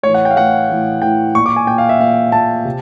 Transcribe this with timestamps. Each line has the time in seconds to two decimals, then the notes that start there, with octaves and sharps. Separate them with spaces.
0.03 A2 C#5
0.08 E3
0.14 F#5
0.25 G5
0.31 F5
0.36 A2 E3 F#5
0.70 A2 E3
1.01 A2 E3 G5
1.35 A#2 C#6
1.46 D6
1.56 G#5
1.67 A#2 G5
1.78 F5
1.89 E5
2.00 A#2 F5
2.32 A#2 A5
2.65 C3